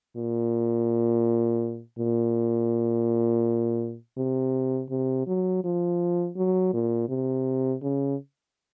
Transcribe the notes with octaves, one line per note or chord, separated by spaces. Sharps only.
A#2
A#2
C3
C3
F#3
F3
F#3
A#2
C3
C#3